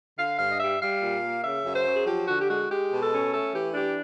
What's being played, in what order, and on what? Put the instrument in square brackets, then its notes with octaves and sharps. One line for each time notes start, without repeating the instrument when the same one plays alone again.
[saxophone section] D3 F5
G2 F5
D#5
G3 E5
G3 F5
A#2
A#3
C#3 E5
F#2
C5
F#3
G#4
F3 G4
D3 F#4
G4
G#3 F#4
G#3 G4
B2
A4
C#4
A3 A4
E3 G4
D4 G4